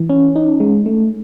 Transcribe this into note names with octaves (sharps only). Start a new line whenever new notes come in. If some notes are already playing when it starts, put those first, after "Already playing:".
Already playing: E3
C#4
D#4
G#3
A3